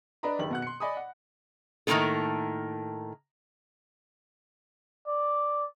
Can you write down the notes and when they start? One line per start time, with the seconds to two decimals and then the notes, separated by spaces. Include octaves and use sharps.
0.23 D4 B4 D5 D#5 A#5 B5
0.39 F#1 D#3 G4 F#7
0.51 B2 F#5 F#6
0.62 C6 C#7
0.80 D5 D#5 G#5 B5 D6 D#6
0.97 F#5
1.87 A2 D#3 F3 A#3 B3 A4
5.07 D5